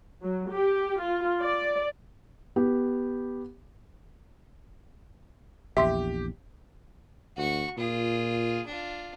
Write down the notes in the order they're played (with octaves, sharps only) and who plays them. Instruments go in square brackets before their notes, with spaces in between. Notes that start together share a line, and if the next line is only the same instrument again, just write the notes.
[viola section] F#3
G4
F4
D5
[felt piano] B3 G4
[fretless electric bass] A#1 E2 [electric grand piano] G4 [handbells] E5 C6 B6
[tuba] D2 [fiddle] F#4 C#6
[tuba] A#2 [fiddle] F4 G#4
[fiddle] D4 F4